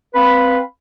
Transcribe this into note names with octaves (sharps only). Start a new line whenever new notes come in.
C4 B4 F5 B5